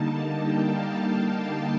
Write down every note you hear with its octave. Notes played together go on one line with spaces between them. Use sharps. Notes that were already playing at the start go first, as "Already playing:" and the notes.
Already playing: D3 G3 A#3 D#4 A5
G5
F5